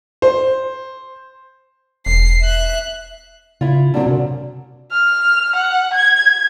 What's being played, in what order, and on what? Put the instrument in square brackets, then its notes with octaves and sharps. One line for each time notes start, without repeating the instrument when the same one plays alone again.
[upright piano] C5
[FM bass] E1 [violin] C7
[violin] E5 F#6
[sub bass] C#3 [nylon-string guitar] E4 F4
[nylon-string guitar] D3 F#3 C4
[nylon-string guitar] F#2 [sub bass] C3
[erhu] F6
F#5
G#6